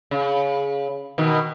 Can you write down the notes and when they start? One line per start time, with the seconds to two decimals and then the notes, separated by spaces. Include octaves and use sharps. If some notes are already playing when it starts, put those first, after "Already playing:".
0.11 C#3
1.18 B2 D#3